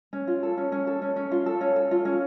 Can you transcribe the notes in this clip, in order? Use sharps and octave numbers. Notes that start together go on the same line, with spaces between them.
C#4
F4
A4
C#4
C#4
A4
C#4
C#4
F4
A4
C#4
A4
F4
C#4